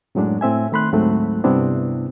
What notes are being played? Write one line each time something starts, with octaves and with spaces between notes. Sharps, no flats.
F#2 A2 F#3 G#3 D4
A2 C4 E5 G#5
D#3 A3 B5 C6 F#6
D2 G#2 F#3 A3 C4
G2 C3 B3 C4 D4 E4